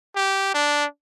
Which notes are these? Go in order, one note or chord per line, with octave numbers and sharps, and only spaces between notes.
G4
D4